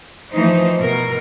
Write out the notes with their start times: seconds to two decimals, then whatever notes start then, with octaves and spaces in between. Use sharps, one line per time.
0.34 E3 F3 A3 D#4 C5
0.79 B2 A#4